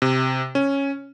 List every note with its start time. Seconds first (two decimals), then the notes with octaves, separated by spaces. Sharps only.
0.02 C3
0.55 C#4